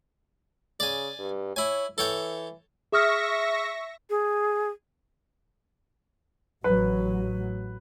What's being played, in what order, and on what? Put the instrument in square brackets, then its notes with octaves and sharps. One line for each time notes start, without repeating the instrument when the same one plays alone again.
[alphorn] C#3 [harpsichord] D5 G#5
[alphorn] G2
[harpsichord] E4 G#5 [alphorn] C#5
[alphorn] E3 [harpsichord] A4 C#5 G5
[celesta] G#4 D#6 F6 [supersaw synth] E5 C#6 A#6
[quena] G#4
[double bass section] A1 F#3 [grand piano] B4